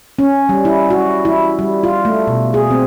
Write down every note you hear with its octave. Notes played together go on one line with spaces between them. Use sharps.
C#4
G3
E4
F#4
E4
G3
F4
A3
B2
G#4
C4